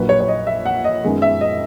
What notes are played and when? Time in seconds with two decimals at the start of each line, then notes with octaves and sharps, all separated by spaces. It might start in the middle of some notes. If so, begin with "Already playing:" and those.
Already playing: A#1 A#2 F#3 B4
0.09 C#5
0.20 C#5
0.28 D#5
0.47 E5
0.65 F#5
0.84 D#5
1.03 F#2 D#3 G#3 B3
1.22 E5
1.41 D#5